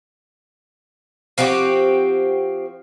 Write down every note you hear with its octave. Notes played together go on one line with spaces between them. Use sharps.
F3 C4 F#4 G4